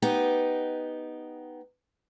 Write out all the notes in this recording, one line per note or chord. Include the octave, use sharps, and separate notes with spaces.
B3 D#4 G4